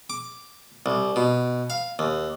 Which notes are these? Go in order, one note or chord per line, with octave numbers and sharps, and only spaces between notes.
D6
C2
B2
F5
D#2